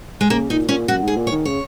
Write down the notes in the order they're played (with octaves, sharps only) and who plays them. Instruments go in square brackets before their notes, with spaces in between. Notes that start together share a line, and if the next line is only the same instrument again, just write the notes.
[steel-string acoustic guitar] G#3
[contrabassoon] C#3 [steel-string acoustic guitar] A#3
[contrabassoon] A#2 [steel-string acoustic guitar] D#4
[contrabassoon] A#2 [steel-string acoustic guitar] C#4
[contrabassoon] F#2 [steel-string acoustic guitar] F#4
[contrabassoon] G#2
[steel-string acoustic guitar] G#4
[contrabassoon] A#2
[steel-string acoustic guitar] C#5
[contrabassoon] D#3
[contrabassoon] C#3 [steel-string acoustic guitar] C#5